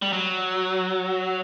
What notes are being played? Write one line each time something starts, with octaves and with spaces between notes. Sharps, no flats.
G3
F#3